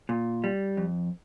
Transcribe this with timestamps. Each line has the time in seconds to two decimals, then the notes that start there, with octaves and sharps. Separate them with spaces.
0.09 A#2
0.44 G3
0.77 F2